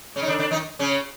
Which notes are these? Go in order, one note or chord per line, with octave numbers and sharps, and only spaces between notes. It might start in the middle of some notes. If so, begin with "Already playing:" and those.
C#3 C#4
D#4
D3 D4
D3 D4
D#3 D#4
C#3 C#4